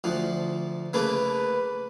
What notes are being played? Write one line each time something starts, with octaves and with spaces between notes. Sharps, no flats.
D2 F3
C#3 A3 A#3 B4